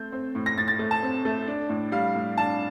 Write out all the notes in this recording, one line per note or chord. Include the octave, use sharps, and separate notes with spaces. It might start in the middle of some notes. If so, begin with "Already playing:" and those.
Already playing: A3 C4 G6
C4
A2
A#6
A2 A6
A6
A3
A5
C4
A3
D4
A2
G3 F5
A2
D4 A5